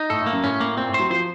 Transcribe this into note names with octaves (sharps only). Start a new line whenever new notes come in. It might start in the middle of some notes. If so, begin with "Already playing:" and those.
Already playing: D#4
A2 A4
A2
A#3
F#2
A2 C#4
A#3
A#2 C4
A2
C5
F#3
F3 C5